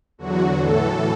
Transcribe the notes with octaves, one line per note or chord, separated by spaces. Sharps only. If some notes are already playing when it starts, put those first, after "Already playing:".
E2 D3 F#3 F#4
A2 E3 A4